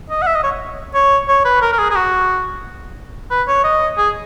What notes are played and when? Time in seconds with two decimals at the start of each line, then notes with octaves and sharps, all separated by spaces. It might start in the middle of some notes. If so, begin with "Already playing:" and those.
0.10 D#5
0.22 F#5
0.27 E5
0.35 D#5
0.44 C#5
0.94 C#5
1.28 C#5
1.45 B4
1.62 A#4
1.73 A#4
1.79 G#4
1.91 G#4
1.96 F#4
3.31 B4
3.48 C#5
3.64 D#5
3.98 G#4